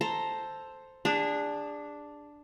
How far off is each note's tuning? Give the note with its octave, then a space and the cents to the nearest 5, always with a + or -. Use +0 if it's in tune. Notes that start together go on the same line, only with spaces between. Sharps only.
A4 +0 C5 +0 A#5 +0
D4 +0 G#4 -30